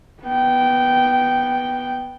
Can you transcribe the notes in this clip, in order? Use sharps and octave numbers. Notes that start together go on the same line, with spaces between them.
B3 G5